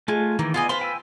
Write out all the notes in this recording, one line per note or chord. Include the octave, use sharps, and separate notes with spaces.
G#3 A3 F4 G#5
D#3 E3 A#3
B3 F4 G#4 D5 D#5 G#5
F4 B4 C5 C6
G5 G#5 E6